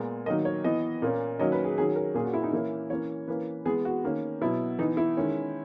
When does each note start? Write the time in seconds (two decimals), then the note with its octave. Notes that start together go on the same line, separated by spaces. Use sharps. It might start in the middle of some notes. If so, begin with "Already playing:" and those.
Already playing: A#2 G#3 B3
0.26 D#3 F#3 A#3 D#5
0.45 C#5
0.64 E3 B3 D#5
1.02 A#2 A#3 C#4
1.39 D#3 F#3 A#3 C#4 D#5
1.52 B4
1.64 G#4
1.78 D#3 F#3 C#4 G#4
1.96 A#4
2.14 A#2 A#3 C#4 G#4
2.25 F#4
2.34 E4
2.43 D#4
2.53 E3 A#3 C#4 E4
2.90 E3 A#3 C#4 C#5
3.27 E3 A#3 C#4 B4
3.65 E3 G#3 B3 G#4
3.85 F#4
4.04 D#3 A#3 C#4
4.41 B2 F#3 B3 E4
4.79 E3 B3 D#4
4.97 E4
5.17 D#3 G#3 C#4